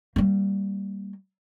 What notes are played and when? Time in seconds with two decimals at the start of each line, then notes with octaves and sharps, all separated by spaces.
0.16 G3 A#3